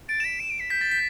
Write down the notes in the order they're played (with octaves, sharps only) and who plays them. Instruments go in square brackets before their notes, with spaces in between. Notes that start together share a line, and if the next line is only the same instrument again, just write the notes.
[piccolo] A6 [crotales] D7
[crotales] E7
[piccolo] B6
E7
D7
B6
[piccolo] G6 [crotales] B6
[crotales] A6
B6